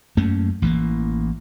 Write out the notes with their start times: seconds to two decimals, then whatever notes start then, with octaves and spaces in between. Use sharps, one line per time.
0.17 F#2 A3 A#3 C#4
0.62 A1 E3 A3 A#3